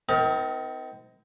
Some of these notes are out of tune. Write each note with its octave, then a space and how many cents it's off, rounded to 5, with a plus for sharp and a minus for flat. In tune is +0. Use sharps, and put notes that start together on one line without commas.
C4 -35 D#4 +30 A#4 +0